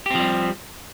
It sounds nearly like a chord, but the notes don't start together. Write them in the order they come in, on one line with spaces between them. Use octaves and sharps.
G4 C4 F3 G3